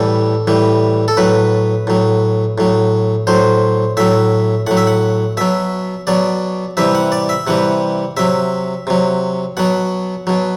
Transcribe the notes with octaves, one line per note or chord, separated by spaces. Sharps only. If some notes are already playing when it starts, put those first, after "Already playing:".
Already playing: A2 E3 G3 A4
A2 E3 G3
A4
A2 F#3 B4
A2 F#3
A2 F#3
A2 F#3 C5
A2 F#3 E5
A2 F#3 F#5
E5
F#5
B2 F#3 E5
B2 F#3 D5
C3 E3 G3 E5
F#5
D5
E5
C3 E3 G3 F#5
C3 F#3 E5
C3 F#3
B2 F#3 F#5
B2 F#3